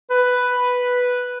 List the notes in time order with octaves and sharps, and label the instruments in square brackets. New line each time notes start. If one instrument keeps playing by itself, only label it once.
[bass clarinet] B4